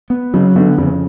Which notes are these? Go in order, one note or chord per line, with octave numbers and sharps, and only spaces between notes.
B3
C#3 F#3
D3 B3
F2 C#3